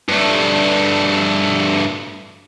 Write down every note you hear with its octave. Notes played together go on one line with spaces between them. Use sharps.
G2 A3